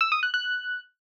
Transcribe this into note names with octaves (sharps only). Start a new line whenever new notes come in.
E6
D#6
F#6
F#6